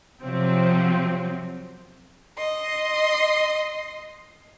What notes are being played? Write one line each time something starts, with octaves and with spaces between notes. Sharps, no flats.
C3 F3 F#3 C4
D#5 C6